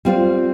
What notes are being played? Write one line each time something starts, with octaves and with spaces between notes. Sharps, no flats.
G3 C4 F4 C5